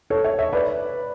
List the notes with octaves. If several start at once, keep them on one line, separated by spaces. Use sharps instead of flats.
A4 C#5
C#5 E5
C#5 E5
B4 D5